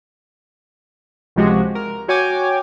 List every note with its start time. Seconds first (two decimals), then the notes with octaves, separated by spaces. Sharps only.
1.36 C#2 C3 F3 G#3 F#4 G4
1.75 A#4
2.08 F#4 C#5 G5 G#5 D6